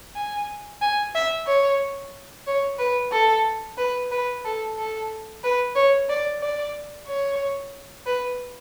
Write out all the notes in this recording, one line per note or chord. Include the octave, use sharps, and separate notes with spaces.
G#5
G#5
E5
C#5
C#5
B4
A4
B4
B4
A4
A4
B4
C#5
D5
D5
C#5
B4